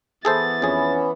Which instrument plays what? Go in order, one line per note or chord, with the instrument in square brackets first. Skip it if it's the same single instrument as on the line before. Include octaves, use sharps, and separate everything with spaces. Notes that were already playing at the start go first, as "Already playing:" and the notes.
[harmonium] E3 B3 E4 [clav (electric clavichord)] G#4 A4 C5 [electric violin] A6
[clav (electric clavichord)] F2 G#4 [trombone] C#4